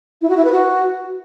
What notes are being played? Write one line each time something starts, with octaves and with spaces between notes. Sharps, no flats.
E4
F#4
E4
B4
F#4